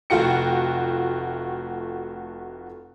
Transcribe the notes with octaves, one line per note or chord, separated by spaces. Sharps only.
F1 A3 F4 F#4 G5 C#7